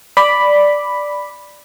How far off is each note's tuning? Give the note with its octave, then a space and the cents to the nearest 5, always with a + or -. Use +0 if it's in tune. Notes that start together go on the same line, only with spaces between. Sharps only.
D5 +0 B5 +0 D6 +0